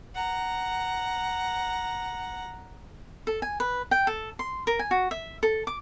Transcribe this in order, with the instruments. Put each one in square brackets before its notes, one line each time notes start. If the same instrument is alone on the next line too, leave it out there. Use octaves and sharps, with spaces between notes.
[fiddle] F#5 A#5
[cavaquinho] A4
G#5
B4
G5
A4
C6
A#4
G#5
F#4
E5
A4
D6